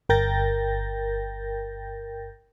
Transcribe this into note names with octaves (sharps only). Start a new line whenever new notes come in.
G1 A#4 G5 G6 A6 A#6